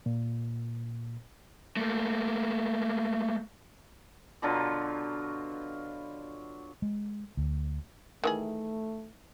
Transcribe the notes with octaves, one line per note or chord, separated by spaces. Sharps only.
A#2
A3 A#3
B2 D3 F#3 F4
G#3
D2
D#3 E3 A3 G#4